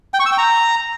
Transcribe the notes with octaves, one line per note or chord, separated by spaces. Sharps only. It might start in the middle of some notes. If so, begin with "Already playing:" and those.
G5
C#6
E6
G5
A#5